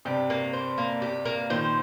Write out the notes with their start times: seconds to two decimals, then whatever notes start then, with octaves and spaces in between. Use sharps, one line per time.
0.05 G2 C3 G4
0.30 A#3
0.53 C5
0.78 A#3
1.02 G4
1.25 A#3
1.50 A#2 D#3 C5